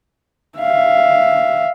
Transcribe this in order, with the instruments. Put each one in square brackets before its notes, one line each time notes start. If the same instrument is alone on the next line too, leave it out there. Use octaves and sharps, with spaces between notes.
[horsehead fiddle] E5 F5